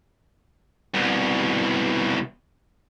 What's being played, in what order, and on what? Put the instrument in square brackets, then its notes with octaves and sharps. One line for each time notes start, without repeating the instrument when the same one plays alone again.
[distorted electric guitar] C2 B2